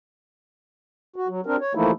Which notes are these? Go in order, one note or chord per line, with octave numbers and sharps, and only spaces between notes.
F#4
F#3
C4 D4 A#4
C#5
E3 F3 A3 A#3 D#4 E4